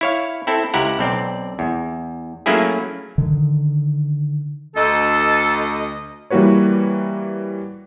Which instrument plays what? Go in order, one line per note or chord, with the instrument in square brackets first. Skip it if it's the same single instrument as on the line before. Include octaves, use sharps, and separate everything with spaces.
[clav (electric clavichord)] E4 C#5 F5
C4 E4 A4
C#2 E4 G4 F#5 A#5
B1 C4 D5
E2
F#3 A3 A#3 C#4 E4 G#4
[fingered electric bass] D3 D#3
[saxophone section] D2 D#5 [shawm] A4
[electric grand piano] E3 G3 A#3 F#4 B4 C#5